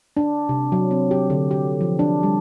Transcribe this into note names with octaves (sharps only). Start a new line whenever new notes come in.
D4
C3
F#3
C4
G4
D3
G4
F3
D4
G3